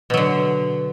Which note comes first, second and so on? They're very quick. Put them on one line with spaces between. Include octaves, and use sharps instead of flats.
B2 F#3 D3